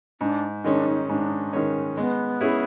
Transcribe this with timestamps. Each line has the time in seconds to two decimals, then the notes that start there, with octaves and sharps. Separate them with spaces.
0.21 G#2 D4
0.64 D#3 G#3 C#4 D4
0.87 D#4
1.09 G#2 D4 D#4
1.53 D#3 G#3 C#4
1.97 G#3 B3
2.41 C#4 E4 G#4